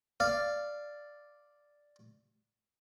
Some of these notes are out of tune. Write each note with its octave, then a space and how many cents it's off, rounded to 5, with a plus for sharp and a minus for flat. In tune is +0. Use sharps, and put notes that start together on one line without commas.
D5 +0 F5 -10